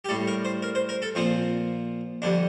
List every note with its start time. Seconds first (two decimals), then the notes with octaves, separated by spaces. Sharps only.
0.05 G4
0.09 A2 G3 A4
0.27 A#4
0.45 C5
0.62 A#4
0.75 C5
0.89 A#4
1.02 A4
1.15 A#2 F3 C4
2.22 F2 D3 G3 D4